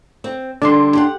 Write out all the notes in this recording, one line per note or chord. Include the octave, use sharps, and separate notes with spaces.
C4
D3 G3 D4 C6
G4 F#5